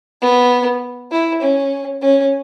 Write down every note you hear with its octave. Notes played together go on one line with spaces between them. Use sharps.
B3
E4
C#4
C#4